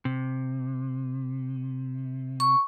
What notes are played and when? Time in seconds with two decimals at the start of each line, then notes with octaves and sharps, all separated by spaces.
0.05 C3
2.40 C#6